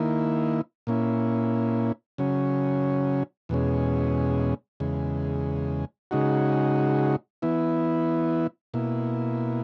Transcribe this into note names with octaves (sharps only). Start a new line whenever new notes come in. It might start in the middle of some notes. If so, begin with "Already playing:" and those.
Already playing: D#3 A#3 E4
A#2 A#3 C#4 E4
C#3 F#3 C#4
E2 B2 G#3 C#4
E2 C#3 G#3
C#3 G#3 D#4 F#4
E3 B3 E4
B2 A#3 E4